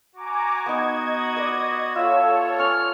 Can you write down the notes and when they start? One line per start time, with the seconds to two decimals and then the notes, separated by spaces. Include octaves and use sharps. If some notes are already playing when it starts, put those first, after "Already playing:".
0.15 F#4 G#5 A#5 D6
0.66 B3 D#4 D#5 G#6
1.36 B4 D5
1.96 F4 A4 C#5 E5 E6
2.59 C#4 F6